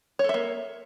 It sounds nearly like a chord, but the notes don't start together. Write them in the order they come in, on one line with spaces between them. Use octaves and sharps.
C#5 A4 E5 A#3